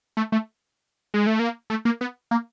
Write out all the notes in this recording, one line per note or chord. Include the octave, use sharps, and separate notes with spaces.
A3
A3
G#3
A3
A#3
A3
A#3
B3
A#3